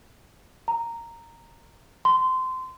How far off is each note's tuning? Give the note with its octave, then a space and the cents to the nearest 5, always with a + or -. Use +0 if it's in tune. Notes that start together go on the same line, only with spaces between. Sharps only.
A#5 -10
C6 -20